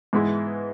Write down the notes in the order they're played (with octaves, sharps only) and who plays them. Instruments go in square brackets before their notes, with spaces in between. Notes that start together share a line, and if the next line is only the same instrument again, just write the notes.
[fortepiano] G#2 E3 G#3 B3 E4